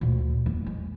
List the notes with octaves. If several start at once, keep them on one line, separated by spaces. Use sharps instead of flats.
D2 A#2
E2 A#3
G#3